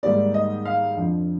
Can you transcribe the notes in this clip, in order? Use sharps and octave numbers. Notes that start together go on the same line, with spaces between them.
G#2 D#3 G3 A#3 D5
D#5
F5
F2 D3 F3